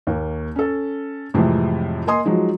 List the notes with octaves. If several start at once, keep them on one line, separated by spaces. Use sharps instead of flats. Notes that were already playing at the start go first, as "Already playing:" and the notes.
D#2 A#3
C#4 A4
F2 A2 C3 E3 F3 G#3
A#3 D#5 G#5 C6 D#6
F3 F#3 G#3 D#4